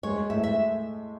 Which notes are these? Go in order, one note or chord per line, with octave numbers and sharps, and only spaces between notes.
G#3 C#5
A2 E5
E5